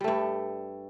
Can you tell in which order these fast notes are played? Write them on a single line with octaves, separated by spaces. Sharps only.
G3 A3 G2